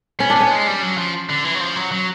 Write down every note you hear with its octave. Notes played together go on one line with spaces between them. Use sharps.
B3 C#4
D4
B3 C#4
G#3
G3
F#3
F3
D3
E3
F#3
F3
F#3
F#3